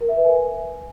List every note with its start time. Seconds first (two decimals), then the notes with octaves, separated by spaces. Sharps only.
0.01 A#4
0.09 E5
0.16 B4
0.24 G#5